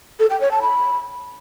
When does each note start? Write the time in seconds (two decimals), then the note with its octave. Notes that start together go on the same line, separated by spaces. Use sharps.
0.20 A4
0.30 G5
0.41 C#5
0.51 A5
0.62 B5